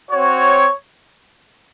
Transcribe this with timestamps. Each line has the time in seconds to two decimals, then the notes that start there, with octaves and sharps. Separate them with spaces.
0.11 C4 F#4 C#5